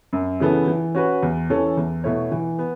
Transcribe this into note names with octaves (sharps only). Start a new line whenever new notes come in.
F#2
C#3 E3 B3 A4
E3
C#4 F#4 B4
E2
E3 C#4 A4
E2
B2 A3 E4 C#5
E3
B3